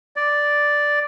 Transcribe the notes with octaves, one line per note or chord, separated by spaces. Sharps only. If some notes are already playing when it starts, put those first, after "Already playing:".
D5